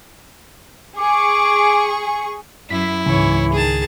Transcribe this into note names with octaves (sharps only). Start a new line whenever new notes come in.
G#4 C#6 D6
F#2 E4 B6
C#2 G#2 E3 C#5
D#3 G#4 A5